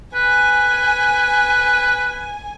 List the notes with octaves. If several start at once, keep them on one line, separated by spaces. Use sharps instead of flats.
B4 G#5